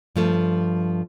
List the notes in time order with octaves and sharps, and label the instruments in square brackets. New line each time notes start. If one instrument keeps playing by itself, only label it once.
[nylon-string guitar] G2 F3 A3